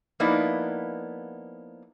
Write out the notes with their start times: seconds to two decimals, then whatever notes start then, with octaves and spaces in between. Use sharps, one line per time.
0.20 F3 A#3 B3 D#4 E4 D5